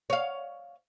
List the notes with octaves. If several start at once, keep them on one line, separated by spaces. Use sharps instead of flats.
C#5 F5